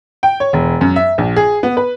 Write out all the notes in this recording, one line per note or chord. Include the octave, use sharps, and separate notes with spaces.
G5
C#5
E1
F#2
E5
A#1
G#4
B3
B4